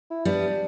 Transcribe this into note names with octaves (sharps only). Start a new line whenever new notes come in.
E4
G3 B3 D4